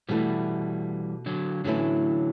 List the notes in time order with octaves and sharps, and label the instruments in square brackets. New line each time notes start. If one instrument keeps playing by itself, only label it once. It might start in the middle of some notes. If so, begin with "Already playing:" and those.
[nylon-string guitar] B2 A3 E4 [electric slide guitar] E3 G3
[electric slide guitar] D3 F#3
[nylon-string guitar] A2 E3 A3 C#4 E4 [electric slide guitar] D3 F#3